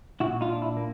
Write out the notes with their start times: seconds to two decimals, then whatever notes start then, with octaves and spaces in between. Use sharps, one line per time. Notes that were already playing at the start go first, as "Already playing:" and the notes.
0.20 A#2 E4 F#4
0.41 D#4 F4
0.49 D4
0.62 E4
0.77 A#3